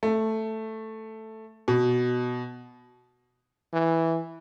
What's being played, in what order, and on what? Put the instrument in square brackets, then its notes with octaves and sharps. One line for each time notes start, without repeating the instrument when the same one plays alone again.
[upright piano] A3
B2
[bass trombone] E3